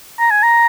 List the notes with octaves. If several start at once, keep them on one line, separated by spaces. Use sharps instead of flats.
A#5
G#5
A#5